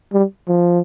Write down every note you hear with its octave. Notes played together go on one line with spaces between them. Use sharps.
G3
F3